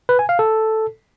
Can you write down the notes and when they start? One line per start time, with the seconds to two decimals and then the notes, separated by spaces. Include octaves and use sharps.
0.09 B4
0.19 G#5
0.29 F5
0.39 A4